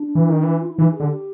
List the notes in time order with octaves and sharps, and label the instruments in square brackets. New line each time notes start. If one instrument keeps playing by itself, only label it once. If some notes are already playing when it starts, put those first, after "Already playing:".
Already playing: [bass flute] D4
[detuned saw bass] E3
D#3
E3
[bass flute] F4
E4
[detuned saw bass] E3 [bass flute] D#4
[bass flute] G#4
[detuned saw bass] D3
[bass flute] G4